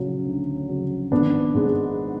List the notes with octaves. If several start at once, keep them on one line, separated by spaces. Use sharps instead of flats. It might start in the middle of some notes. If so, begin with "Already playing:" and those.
Already playing: C#3 F#3
D2
C#3 F#3
G#1 B3 D4
G#2 G#3